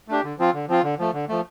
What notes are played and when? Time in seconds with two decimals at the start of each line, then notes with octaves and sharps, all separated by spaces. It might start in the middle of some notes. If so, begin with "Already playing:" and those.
0.08 A3 D4 G4
0.24 D3
0.38 F3 C4 F4
0.54 D3
0.68 F3 C4 F4
0.83 D3
0.99 F3 A3
1.13 D3
1.29 F3 A3